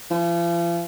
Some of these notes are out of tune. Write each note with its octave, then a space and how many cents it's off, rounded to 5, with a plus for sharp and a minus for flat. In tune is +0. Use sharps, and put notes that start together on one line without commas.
F3 -40